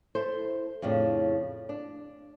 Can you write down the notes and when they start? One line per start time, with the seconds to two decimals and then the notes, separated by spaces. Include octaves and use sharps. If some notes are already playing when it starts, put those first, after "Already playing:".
0.15 E4 A4 C5
0.82 F2 A2 C#3 D4
1.69 D4